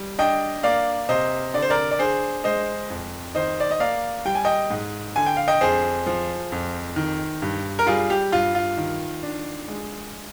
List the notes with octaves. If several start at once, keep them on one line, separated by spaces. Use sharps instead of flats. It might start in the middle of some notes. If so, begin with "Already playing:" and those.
Already playing: G3
D4 D#5 G5
A#3 D5 F5
C3 C5 D#5
D3 D5
C5
A#4 D5
D5
D4 G#4 C5
G#3 C5 D#5
F2
D#3 C5 D#5
D5
D#5
A#3 D5 F5
G3 G5
G#5
D#5 G5
G#2
D3 G#5
G5
F5
D#5 G5
F2 G#4 C5
F3
F2
D#3
G2
A#4
G3 F4 G#4
G4
G2 F4
F4
D#3
D4
G#3